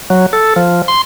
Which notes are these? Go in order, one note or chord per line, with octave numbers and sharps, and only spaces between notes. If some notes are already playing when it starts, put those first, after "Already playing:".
F#3
A4
F3
C6